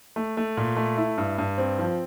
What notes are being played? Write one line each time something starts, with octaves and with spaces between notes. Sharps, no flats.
A3
A3
A#2
A3
E4
G2
G2
C4
F3